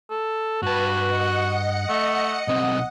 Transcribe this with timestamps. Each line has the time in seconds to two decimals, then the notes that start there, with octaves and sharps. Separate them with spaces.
0.10 A4
0.62 G2 F#4 B4 A5
1.06 D#5 F#5 C#7
1.89 A3
2.48 B1 C4 D#5 F#5